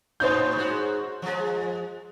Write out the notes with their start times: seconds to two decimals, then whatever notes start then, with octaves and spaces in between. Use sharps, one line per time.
0.20 A2 B3 D#4 C5 C#5 G6
0.56 G#2 F#4
1.22 F3 G#3